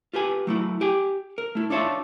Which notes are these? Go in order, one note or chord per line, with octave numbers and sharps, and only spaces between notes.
F4 G4 B4 G#5
F#3 A3 E4
G4 G5 G#5
A#4
A3 E4
D4 D#4 F4 C#5 E5 A5